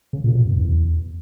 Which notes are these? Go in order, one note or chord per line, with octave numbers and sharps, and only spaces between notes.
C#3
A#2
B2
F#2
E2